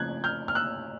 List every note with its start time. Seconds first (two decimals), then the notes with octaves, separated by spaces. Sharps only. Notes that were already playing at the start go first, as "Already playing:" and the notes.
Already playing: C#3 F3 A3 C4 F#6 G#6
0.24 F6 G6
0.48 F6
0.55 E6 F#6